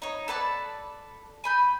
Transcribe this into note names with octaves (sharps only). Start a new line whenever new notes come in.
D#4 C#5
A4 B4 D5 A5
G#5 B5 G6